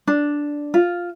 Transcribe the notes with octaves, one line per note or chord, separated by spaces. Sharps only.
D4
F4